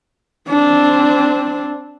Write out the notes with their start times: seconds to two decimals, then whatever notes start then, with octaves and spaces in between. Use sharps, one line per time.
0.49 C4 D4